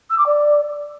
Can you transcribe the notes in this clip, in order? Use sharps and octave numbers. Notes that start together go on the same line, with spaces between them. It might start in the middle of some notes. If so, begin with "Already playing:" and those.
E6
D6
D5